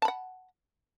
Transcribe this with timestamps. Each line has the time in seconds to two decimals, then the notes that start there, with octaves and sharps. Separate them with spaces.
0.02 A5
0.05 B5
0.08 F#5